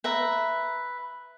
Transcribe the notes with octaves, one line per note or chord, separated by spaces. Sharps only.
B4 E5 A#5